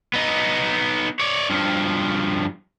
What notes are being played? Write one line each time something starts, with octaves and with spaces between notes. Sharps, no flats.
B3 D#4
C#5 D5
G2 F3